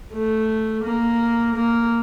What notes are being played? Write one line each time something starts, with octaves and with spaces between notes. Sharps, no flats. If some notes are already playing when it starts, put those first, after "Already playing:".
A3
A#3
A#3